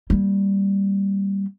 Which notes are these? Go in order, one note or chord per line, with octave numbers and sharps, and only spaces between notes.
G3 A#3